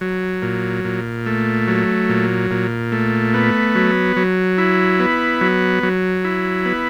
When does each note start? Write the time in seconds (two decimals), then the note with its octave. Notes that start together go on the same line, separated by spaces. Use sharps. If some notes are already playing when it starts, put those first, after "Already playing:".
0.01 F#3
0.42 A#2
0.84 A#2
1.26 A3
1.67 F#3
2.09 A#2
2.51 A#2
2.92 A3
3.34 B3
3.75 F#3
4.16 F#3
4.58 E4
5.00 B3
5.41 F#3
5.83 F#3
6.25 E4
6.66 B3